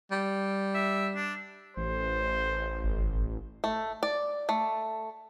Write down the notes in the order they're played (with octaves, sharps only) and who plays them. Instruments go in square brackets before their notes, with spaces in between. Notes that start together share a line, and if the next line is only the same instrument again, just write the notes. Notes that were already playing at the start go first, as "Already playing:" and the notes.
[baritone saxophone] G3
[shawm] E5
D4
[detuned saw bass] A1 [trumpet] C5
[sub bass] G1
[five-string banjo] A3
D5
A3